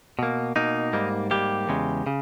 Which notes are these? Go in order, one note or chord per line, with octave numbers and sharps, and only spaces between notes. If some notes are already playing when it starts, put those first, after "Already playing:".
B2 A#3
B2 A#3 D#4
G#2 G3 A#3
G#2 G3 A#3 G4
E2 C#3 G#3
C#3